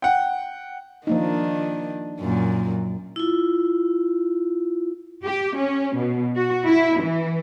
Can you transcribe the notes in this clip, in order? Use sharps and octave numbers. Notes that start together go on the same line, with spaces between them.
F#5 G5
D#3 F3 A#3 D4 D#4
F#2 A#2
E4 F4
G4
C#4
B2
F#4
E4
E3